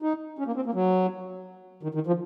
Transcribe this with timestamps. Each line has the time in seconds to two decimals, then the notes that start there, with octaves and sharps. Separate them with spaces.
0.02 D#4
0.39 C#4
0.47 A#3
0.56 C4
0.66 A#3
0.74 F#3
1.83 D#3
1.94 D#3
2.07 F3